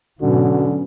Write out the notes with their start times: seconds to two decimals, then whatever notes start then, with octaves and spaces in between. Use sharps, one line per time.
0.21 G#2 B2 D3 F#3 C#4 F#4